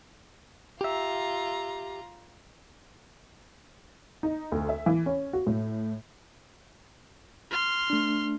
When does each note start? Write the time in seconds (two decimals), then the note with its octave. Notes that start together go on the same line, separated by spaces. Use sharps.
0.81 F4 G4 E5 A#5
4.23 D#4
4.52 D2
4.69 E5
4.86 E3
5.06 C#4
5.33 F#4
5.47 A2
7.51 C6 F6
7.90 A3 D4